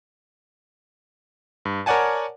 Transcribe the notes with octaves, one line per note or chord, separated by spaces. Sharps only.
G2
A#4 C#5 D5 F#5 G#5 A5